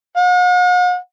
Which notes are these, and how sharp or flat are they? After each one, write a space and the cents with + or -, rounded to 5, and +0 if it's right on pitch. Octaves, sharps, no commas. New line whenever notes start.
F#5 -45